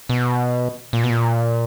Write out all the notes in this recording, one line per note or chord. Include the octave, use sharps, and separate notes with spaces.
B2
A#2
B2
A#2